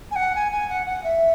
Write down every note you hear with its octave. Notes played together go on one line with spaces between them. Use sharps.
G#5
F#5
G#5
G#5
F#5
F#5
E5